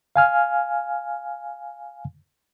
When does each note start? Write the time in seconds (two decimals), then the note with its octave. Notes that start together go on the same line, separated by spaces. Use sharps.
0.16 F5 G#5 F6